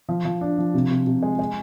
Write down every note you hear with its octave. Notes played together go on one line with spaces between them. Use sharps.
F3
F3
D4
F3
C3
C3
C3
G#3
G#3